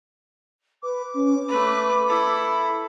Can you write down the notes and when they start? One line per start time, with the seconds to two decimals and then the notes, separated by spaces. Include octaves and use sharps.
0.83 B4 D6
1.14 C#4
1.48 A3 B4 B5
2.08 E4 A4